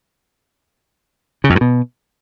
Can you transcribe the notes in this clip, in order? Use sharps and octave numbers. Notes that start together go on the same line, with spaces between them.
C#3
F2
G2
B2